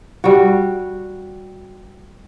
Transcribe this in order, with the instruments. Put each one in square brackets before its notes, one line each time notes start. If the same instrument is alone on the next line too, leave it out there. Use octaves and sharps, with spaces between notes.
[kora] G3 F#4